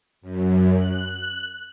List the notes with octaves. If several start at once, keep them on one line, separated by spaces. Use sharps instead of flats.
F#2
F#6